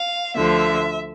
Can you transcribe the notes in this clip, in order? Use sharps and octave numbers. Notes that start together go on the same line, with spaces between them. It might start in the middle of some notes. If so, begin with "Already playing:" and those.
Already playing: F5
D2 D3 F3 E5